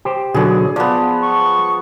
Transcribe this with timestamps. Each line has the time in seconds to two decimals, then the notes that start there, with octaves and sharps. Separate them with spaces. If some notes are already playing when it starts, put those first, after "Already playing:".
0.05 G4 C5
0.34 B2 D3 F#3 G#4 D5
0.76 F3 B3 D5
1.23 C#6